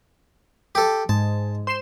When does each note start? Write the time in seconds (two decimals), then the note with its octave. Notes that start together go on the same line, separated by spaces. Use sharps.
0.75 G4 A4
1.09 G#2 A5
1.67 C5 C7 E7